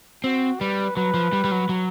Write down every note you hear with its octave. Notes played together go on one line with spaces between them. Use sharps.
C4 F#4
G3 B4
F#3 B4
F3
G3
G3
F#3
F#3